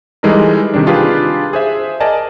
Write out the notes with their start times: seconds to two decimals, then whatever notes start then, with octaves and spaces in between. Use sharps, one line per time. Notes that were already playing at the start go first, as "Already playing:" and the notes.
0.23 E3 G3 G#3 D#4 A4 A#4
0.74 C3 D#3 G3 D4
0.86 D4 F4 G4 G#4 B4
1.53 G#4 C5 E5
2.00 A#4 D5 D#5 G#5 A5